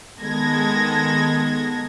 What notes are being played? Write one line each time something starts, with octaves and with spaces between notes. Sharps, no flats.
D#3 G#3 B3 A4 G#6 A#6